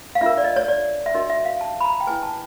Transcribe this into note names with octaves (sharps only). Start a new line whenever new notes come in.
F5
D4 F4 A#4 E5
D5
D#5
C#5
D5
E5
D4 F#4 A#4 D#5
E5
F5
A5
B5
A#5
G5
E4 G#4 B4 G#5
A5